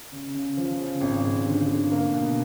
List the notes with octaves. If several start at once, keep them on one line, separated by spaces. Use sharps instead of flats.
C#3
C#3
F3
C#3
G#1
G#1
D3
D3
A#3
B2